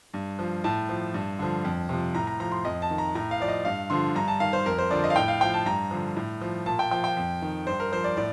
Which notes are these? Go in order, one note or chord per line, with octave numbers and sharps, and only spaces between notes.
G2
F3
A2 A5
F3
G2
D3 F3
F2
C3 F3
A2 A#5
A#5
F3 A#5
C6
F2 D#5
A5
D#3
A#5
A2 A#5
F5
F3 D5
D#5
G2 F5
D3 F3 C6
G2 A#5
A5
D#3 F5
C5
F2 A#4
C5
D3 F3 D5
D#5
F5
A2 G5
F5
F3 G5
A5
G2 A#5
D3 F3
A2
F3
A#2 A5
G5
F3 G5
G5
F2
D#3
G2 C5
A#4
F3 C5
D5
A2 D5